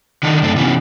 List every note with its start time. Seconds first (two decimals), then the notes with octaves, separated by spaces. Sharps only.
0.23 D3 D#3 D4 D#4
0.42 F#2 A3 C4 D4
0.56 C3 E3 B3 C#4